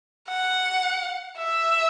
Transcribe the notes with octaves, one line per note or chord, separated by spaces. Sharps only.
F#5
E5